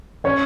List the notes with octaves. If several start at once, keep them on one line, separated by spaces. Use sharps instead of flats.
C#4 C#5